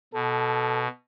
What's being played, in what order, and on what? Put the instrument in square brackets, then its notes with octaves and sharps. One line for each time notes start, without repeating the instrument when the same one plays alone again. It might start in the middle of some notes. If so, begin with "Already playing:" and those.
[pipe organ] B2 [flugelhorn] A4